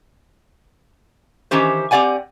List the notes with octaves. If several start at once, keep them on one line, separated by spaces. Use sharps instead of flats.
D#3 E3 C#4 G4 C5
C4 G4 D5 F#5 G#5